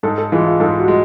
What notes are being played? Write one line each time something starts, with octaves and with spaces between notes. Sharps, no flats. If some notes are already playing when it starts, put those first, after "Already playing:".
G#2 A4
A4
E3 G#3 F4
E4
F4
G#2 A4
F#4
G#3